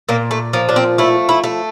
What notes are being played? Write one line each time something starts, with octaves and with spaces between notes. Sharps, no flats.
A#2 A#3
A3
F3 A#3
D4
C4
A3 E4
E4
A3